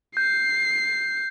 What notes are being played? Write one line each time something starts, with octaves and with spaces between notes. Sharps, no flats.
G6 C7